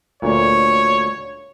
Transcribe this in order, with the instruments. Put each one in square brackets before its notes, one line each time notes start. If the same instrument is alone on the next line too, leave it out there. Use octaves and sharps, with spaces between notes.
[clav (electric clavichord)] D2 A#2 [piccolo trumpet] C#5